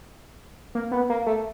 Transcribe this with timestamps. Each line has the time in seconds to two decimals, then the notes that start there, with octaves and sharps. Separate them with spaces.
0.75 A#3
0.92 B3
1.10 A#3
1.27 A3